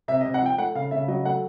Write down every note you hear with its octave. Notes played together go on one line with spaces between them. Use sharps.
C3 E5
D#5
C3
F#5
F3 G5
A3 F#5
C#3 F5
C#3 E5
F#3 D#5
A3 F#5